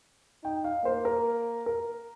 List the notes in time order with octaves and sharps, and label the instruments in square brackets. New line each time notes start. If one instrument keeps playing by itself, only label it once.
[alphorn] D#4 [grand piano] G5
[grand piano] F5
[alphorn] A#3 [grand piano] C5
[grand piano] A#4
A#4